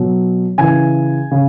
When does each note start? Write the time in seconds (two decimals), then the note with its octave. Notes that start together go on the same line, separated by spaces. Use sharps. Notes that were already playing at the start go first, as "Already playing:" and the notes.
Already playing: B2 F#3
0.58 C#3 E3 G#5
1.31 C#3